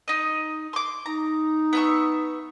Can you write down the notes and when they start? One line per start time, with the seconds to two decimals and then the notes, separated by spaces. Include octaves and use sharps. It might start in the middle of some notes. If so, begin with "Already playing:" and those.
0.08 D#4 D#5
0.73 C6 D6
1.06 D#4 A#5
1.73 B3 E5 C#6